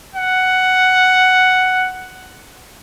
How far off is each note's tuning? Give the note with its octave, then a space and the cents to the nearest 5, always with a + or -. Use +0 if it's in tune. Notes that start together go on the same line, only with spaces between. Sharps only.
F#5 +5